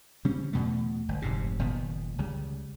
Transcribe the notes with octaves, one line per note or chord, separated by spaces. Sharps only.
C#3 G3 C4 C#4
E2 B2 F#3 A3
G1
F1 G#2 C3
F#1 A#2 D#3 B3
C#2 C#3 G3